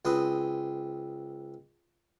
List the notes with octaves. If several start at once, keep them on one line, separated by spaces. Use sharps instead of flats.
C#2 C4 B4 D#6